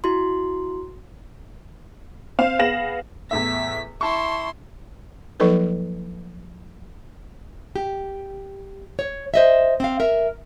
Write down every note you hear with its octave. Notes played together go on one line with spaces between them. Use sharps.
E4 F#4 C6
C4 C5 F5 E7
B3 G#4 F5 A#6 E7 F#7
E2 A2 E5 B6
E4 A5 C6 C#6
F3 F#3 A#3 D#4 A4 B4
G4
C#5
C5 D#5 E5
C4 F5
A#4 E5